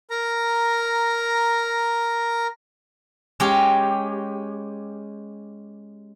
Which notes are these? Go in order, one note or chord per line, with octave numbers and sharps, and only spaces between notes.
A#4 A#5
G#3 C#4 G4